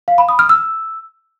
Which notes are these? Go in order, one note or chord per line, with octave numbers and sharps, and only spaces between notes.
F5
B5
D#6
F6
E6